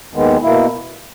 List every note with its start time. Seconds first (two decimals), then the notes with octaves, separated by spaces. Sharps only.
0.13 D#2 D#3 G#3 B3
0.43 B2 A#3 E4